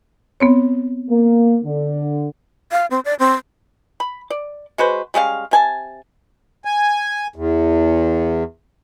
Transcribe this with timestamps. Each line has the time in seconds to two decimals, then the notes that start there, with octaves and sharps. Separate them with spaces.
0.40 B3 C4 C#5
1.10 A#3
1.64 D3
2.72 F5
2.91 C4
3.05 D5
3.19 C4
4.00 B5
4.30 D5
4.78 G#3 F#4 B4 C5
5.14 G3 G#3 C#4 F5
5.51 C3 G#5 A5
6.65 G#5
7.36 E2